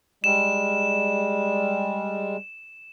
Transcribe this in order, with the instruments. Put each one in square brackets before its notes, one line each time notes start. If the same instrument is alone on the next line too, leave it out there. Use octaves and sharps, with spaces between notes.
[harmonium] G3 G#3 [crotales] E7